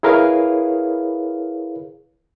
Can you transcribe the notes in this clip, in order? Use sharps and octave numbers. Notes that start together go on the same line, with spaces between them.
E4 G#4 A#4 B4 C#5 F5